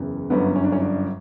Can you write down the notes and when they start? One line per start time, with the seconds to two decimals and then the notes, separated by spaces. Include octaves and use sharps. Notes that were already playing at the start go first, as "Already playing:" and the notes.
Already playing: F#1 E2 C#3 E3
0.30 G1 F#2 D3 B3
0.56 C#4
0.64 D4
0.72 C#4
0.82 D4